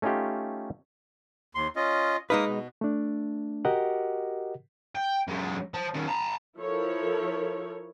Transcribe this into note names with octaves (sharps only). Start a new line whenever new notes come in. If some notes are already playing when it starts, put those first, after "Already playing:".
A3 C#4 D#4 F4 G4
D#2 C6
C#4 F4 D#5
G#3 A#3 D#4 A#4 B4 D#6
B2
A3 D4
F#4 G4 A#4 D#5 F#5
G5
F#2 G#3
C5 A5
D#3 C#4
A5 A#5
F3 E4 A4 A#4 C#5